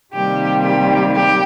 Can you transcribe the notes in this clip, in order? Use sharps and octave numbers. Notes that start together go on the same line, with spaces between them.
C3 D#3 G3 A#3 G4
G4
G4